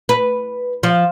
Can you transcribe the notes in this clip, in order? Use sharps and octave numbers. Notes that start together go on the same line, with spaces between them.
B4
F3